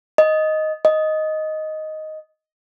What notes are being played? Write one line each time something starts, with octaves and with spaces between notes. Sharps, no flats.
D#5
D#5